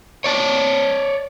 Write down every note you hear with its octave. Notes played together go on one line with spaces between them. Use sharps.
C#5 D5 A5